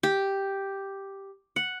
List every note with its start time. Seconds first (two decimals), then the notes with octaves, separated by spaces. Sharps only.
0.03 G4
1.56 F#5